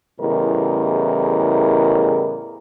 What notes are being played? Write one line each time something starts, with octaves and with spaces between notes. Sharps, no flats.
E2 A2 C#3 G3 A#4 D#5